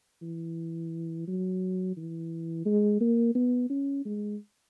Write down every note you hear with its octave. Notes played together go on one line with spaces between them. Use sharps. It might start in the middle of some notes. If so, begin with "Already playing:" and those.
E3
F#3
E3
G#3
A#3
B3
C#4
G#3